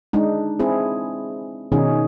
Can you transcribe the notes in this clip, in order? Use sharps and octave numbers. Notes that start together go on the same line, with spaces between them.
G#3 D4 D#4
C4 E4 G#4
B2 D#3 C#4 D#4 G#4